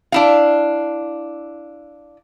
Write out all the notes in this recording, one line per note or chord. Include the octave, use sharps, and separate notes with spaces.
D4 E4 F5